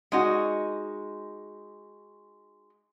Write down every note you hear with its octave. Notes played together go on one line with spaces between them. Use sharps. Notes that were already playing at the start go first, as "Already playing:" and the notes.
G#3 D#4 F#4